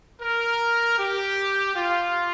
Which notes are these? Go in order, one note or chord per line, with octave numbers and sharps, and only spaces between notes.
A#4
G4
F4